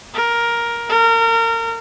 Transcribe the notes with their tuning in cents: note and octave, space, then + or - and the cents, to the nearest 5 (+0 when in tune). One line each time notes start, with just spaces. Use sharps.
A#4 +10
A#4 -30